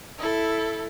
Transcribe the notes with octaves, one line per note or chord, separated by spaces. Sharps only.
E4 A4